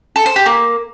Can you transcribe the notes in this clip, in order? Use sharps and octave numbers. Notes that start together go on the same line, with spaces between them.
A4
C5
G4
A#3